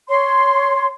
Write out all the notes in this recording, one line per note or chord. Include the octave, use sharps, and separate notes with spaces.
C#5 C6